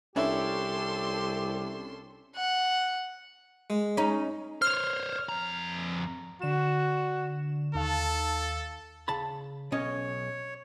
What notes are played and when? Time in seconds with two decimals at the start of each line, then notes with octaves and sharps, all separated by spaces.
0.16 C2 C#4 D4 E4 G4 A4 C6
2.36 F#5
3.70 G#3
3.97 C#4 D#4
4.62 C5 C#5 F6
5.29 F2 A#5
6.42 D3 F#4 E7
7.75 D#2 A4 F5 A5
9.08 C#3 A5 B5
9.72 B1 C#4 C#5 D#5